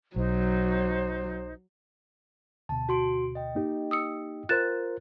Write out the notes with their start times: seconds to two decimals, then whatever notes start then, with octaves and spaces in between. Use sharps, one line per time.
0.16 B1 F#3 D#4 C5
2.69 D2 B2 A5
2.89 F#4 C6 D7
3.35 D#5 G5
3.55 A#3 D#4 G4
3.91 D#6 E6 C#7
4.49 F4 A#4 C5 F#6 A6 E7